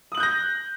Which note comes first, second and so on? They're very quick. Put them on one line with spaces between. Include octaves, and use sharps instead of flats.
D#6 F#7 F#6 G6 A#6